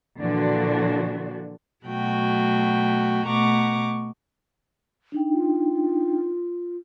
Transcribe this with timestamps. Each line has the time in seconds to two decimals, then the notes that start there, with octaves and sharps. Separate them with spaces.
0.20 A#2 D3 E3 F3 D4 F#4
1.85 B2 F#3 A3 F#4 G5
3.26 B2 A3 F#5 A#5 C#6 D6
5.12 D4 D#4 G5
5.32 F4